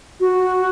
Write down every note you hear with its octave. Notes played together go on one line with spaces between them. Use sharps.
F#4